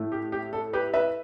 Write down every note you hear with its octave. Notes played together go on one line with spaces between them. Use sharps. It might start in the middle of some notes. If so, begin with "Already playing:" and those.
Already playing: A2 A3 E4
G4
G4
A4
G4 B4
B4 E5